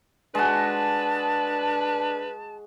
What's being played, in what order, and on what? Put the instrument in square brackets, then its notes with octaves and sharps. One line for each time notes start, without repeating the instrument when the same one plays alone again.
[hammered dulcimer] G#3 F#4 [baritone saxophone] D4 [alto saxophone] B4 [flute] A5